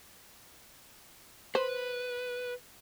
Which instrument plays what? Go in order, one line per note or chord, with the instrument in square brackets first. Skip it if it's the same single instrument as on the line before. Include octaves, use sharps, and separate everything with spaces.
[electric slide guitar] B4 [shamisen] C5